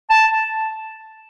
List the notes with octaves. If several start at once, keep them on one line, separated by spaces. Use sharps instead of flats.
A5